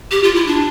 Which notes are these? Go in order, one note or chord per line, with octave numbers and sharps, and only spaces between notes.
G4
F4
E4
D4